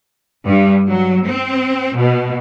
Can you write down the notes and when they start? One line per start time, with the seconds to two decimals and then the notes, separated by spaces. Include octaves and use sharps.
0.45 G2
0.86 F#3
1.26 C4
1.96 B2